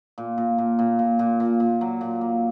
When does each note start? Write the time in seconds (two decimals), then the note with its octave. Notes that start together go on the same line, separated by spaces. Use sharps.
0.18 A#2
0.38 A#2
0.58 A#2
0.79 A#2
0.99 A#2
1.19 A#2
1.40 A#2
1.60 A#2
1.81 F#3
2.01 A#2
2.21 A#3